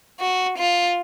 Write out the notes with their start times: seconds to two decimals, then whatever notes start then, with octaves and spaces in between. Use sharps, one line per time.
0.20 F#4
0.58 F4